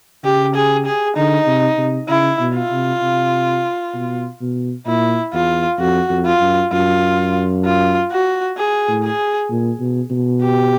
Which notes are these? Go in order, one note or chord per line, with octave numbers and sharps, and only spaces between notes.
C#3 G4
G#4
G#4
D3 D#4
C3
C3
C#3 E4
B2
F4
C3
C3
B2
B2
A#2 E4
E2 F4
F2 F#4
F2
F4
F#2
F#2 F4
F4
F#4
G#4
A2
G#4
A#2
B2
B2
G4